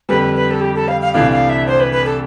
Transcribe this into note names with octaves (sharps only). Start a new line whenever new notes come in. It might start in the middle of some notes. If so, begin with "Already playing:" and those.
F2 D3 G3 B4
B4
A4
G4
A4
F5
F5
C2 C3 E3 A3 D4 F5
F5
E5
C5
B4
B4
A4